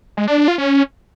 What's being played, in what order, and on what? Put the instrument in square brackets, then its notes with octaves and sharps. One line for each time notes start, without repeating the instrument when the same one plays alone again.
[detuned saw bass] G#3
D4
D4
F4
C#4